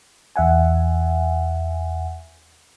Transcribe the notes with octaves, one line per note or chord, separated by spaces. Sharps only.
E2 E5 F#5 G#5